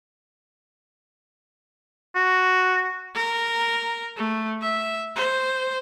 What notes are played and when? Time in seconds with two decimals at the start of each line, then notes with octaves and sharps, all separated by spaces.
2.16 F#4
3.15 A#4
4.17 A3
4.62 E5
5.16 C5